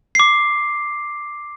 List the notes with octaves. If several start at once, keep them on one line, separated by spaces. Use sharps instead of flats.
D6 C7